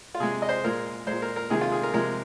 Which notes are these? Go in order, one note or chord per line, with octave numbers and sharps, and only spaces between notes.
F4
C3 G#3 G#4
D#5
C5
A#2 G#3 A#4
A#2 G#3 C5
A#4
A#4
C3 D#3 G#3 G#4
F4
G#4
A#4
C3 F3 G#3 A#4